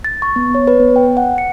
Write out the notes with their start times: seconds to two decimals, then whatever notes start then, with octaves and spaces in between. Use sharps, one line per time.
0.04 A6
0.22 C#6
0.36 B3
0.55 C#5
0.67 B4
0.80 B3
0.96 G5
1.17 F#5
1.38 C#7